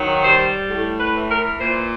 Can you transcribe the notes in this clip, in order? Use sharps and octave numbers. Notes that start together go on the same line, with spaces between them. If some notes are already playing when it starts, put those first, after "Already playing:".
Already playing: D#3 F#3
G3 C5
A2
B4
E3
A#4
A#2 C5